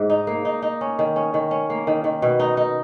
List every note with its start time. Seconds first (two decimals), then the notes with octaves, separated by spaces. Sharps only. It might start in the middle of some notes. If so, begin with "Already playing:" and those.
Already playing: G#2
0.10 D#4
0.27 A#3
0.45 D#4
0.62 D#4
0.81 C#4
0.99 D#3
1.16 C#4
1.34 D#3
1.51 C#4
1.70 A#3
1.87 D#3
2.04 D#3
2.22 B2
2.40 D#4
2.57 D#4